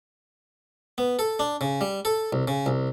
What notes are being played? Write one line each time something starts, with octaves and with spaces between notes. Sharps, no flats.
B3
A4
D4
C#3
G3
A4
C2
C#3
C2